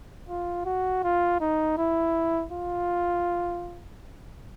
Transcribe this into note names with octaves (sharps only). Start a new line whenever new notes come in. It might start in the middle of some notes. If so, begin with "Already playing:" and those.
F4
F#4
F4
D#4
E4
F4